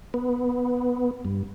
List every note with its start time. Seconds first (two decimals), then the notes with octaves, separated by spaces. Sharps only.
0.14 B3
1.25 G2